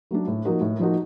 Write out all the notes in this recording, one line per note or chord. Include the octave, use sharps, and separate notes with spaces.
F#3 A3 D4
A2
F3 A#3 D#4 F#4
A2
F3 A#3 D#4 F#4